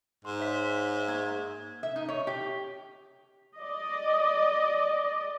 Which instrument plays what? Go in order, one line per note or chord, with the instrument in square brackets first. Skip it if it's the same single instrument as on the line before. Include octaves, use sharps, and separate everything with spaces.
[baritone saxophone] G#2 [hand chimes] C6
[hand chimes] C#5 E5 B6
A#3 G#6
[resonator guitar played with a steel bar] E5
D#4
C#5
G4
[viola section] D5 D#5